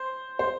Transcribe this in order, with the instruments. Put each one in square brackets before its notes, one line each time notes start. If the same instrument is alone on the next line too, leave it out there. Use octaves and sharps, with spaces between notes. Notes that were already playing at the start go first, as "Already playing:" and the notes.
Already playing: [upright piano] C5
C5